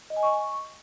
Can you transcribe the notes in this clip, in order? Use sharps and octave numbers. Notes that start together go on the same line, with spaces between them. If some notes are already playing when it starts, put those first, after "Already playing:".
D#5
G#5
C#6